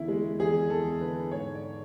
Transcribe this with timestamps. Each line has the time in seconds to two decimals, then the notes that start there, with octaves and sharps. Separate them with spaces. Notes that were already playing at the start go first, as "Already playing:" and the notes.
Already playing: E2 D3 C#4 E4
0.08 G#3
0.39 E2 G#4
0.70 E2 A4
1.01 D3 B4
1.32 G#2 C#5
1.55 D5